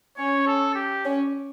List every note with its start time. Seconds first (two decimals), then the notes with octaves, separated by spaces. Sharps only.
0.17 C#4 C#5
0.46 A4
0.75 G4
1.04 C#4